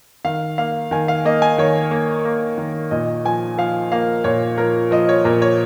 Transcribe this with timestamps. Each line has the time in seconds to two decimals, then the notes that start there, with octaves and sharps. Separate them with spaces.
0.25 D#3 F5
0.58 A#3 F5
0.91 D#3 G#5
1.08 F5
1.25 A#3 D#5
1.42 G#5
1.58 D#3 C#5
1.91 A#3
2.25 A#3
2.58 D#3
2.91 A#2 D#5
3.25 F3 G#5
3.58 F3 F5
3.92 A#3 F5
4.24 A#2 C#5
4.58 F3 A#4
4.91 F3 D#5
5.09 C#5
5.25 A#2 A#4
5.42 C#5